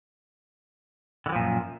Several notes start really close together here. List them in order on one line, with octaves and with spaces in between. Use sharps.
D3 E3 F3 A#2 F#2